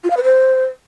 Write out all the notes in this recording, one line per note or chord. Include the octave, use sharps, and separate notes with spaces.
F4
F5
B4
C5